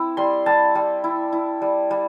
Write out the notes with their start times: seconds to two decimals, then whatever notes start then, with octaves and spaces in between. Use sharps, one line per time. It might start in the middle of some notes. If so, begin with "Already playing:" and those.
Already playing: C4 E4
0.17 G3 C6
0.46 G3 A5
0.75 G3
1.04 E4
1.33 E4
1.62 G3
1.91 G3